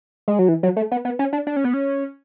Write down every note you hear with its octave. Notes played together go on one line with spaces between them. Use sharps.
G#3
F#3
E3
F#3
A3
B3
B3
C#4
D4
D4
C#4
B3
C#4